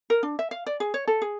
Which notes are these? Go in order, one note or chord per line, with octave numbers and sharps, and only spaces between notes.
A#4
D4
E5
F5
D5
G#4
C#5
A4
G#4